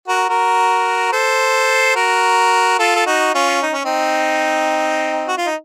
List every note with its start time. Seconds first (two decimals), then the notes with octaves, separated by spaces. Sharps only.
0.08 F#4 A#4
0.29 F#4 A#4
1.12 A4 C5
1.96 F#4 A#4
2.79 F4 A4
2.96 A4
3.06 D#4 F#4
3.34 C#4 F4
3.62 D#4
3.73 C#4
3.85 C4 D#4
5.28 F#4
5.37 F4
5.46 D#4